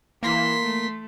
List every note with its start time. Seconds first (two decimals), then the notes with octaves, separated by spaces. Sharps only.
0.23 E3 A#3 C6 B6
0.63 A3